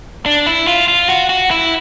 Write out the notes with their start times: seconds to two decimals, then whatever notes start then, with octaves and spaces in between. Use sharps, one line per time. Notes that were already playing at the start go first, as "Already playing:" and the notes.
0.26 D4
0.47 E4
0.67 F4
0.88 F4
1.09 F#4
1.29 F#4
1.51 E4